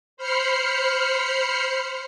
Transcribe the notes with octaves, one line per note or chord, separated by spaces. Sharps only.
C5 B5 F6 C7 C#7